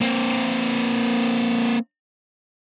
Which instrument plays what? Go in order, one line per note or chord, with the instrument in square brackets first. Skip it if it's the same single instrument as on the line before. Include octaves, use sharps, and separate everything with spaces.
[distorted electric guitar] A#3 C4